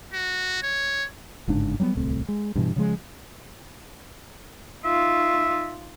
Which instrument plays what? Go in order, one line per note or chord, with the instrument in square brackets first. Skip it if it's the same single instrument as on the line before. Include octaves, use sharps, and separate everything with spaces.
[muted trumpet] F#4
C#5
[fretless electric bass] G1 G#2 C#3 D4
F#3 G3 A#3 B3
D1 C2 A3 C4
G#3
G2 B2 E3
C#3 F3 G#3
[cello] D#4 F4 [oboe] E5